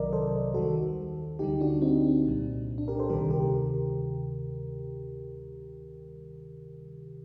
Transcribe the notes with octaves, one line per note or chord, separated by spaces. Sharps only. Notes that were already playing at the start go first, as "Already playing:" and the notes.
Already playing: C2 C3 D#3 F#3 A#4 D5 D#5
A4 C5
D#2 D#3 G3 F#4 A4
D2 D3 G3 D#4 G4
D4 F#4
C4 D#4
D4
C2 A#2 G3
D4
G4 A#4
A4 C5
D2 C3 D#3 G3 G4 A#4
G4 A#4